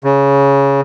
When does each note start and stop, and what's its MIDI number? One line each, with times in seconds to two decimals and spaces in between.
0.04 0.81 49